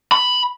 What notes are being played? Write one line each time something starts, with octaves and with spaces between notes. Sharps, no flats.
B5